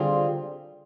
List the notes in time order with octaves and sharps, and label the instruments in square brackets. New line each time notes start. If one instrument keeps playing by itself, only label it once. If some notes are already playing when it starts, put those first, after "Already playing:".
Already playing: [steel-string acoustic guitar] D3 G3 C4 F4 G#4